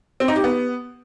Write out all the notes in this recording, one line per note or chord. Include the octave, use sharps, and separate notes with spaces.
C4
D#4
G4
B3